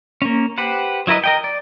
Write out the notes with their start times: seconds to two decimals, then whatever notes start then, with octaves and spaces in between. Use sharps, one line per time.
0.22 A#3 C#4
0.58 G4 B4 C5 F#5
1.07 F#3 E4 A#4 B4 D#5
1.24 A#4 D#5 G5
1.44 D5